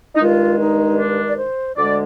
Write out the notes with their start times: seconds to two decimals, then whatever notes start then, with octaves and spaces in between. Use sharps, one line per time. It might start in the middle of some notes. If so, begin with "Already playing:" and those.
0.15 D#4
0.20 G2 D#3 G#3 F4
0.60 D#4
0.99 D4
1.29 D5
1.38 C5
1.77 D2 D3 G#3 D5